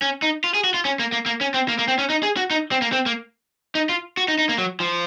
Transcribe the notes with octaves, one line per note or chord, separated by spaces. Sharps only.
C#4
D#4
F4
G#4
F#4
F4
C#4
A#3
A#3
A#3
C#4
C4
A#3
A#3
C4
C#4
D#4
G#4
F#4
D#4
C4
A#3
C4
A#3
D#4
F4
F#4
D#4
D#4
A#3
F#3
F3